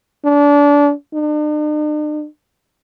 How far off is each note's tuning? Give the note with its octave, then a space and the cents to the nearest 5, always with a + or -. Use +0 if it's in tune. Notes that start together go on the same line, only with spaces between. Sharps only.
D4 -25
D4 +45